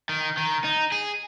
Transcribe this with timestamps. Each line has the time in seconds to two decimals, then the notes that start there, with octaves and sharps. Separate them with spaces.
0.09 D#3
0.37 D#3
0.64 D#4
0.92 G#4